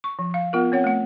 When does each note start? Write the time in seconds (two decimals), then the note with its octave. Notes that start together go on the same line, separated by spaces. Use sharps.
0.04 C#6
0.19 F3
0.34 F5
0.53 B3 F4 A#4
0.72 C4 C#5 F#5
0.84 A3 F#5